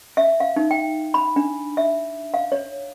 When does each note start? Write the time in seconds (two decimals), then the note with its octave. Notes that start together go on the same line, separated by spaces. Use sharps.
0.17 E5
0.40 F5
0.56 D#4
0.71 G5
1.14 B5
1.36 D4
1.77 E5
2.34 F5
2.52 C#5